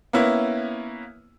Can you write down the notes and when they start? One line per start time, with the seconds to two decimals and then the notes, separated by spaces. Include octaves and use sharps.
0.13 A#3 B3 C#4 E4